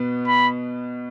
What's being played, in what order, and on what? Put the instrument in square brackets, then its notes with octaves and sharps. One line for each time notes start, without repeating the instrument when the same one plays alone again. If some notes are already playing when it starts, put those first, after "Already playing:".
Already playing: [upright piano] B2 B3
[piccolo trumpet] B5